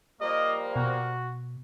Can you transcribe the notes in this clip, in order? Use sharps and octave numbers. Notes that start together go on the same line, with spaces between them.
F3 G3 A#3 D#5
B2 F#4